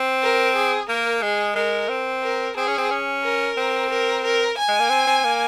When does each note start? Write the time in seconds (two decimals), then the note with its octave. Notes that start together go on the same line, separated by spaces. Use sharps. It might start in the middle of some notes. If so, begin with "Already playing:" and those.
Already playing: C4
0.23 A#4
0.55 G#4
0.89 A#3 A#4
1.22 G#3 G#4
1.56 G#3 A#4
1.89 C4
2.23 A#4
2.57 C4 G#4
2.67 C#4
2.78 C4
2.90 C#4
3.23 A#4
3.57 C4
3.90 A#4
4.24 A#4
4.58 G#5
4.68 G#3
4.80 A#3
4.90 C4
5.07 C4
5.25 A#3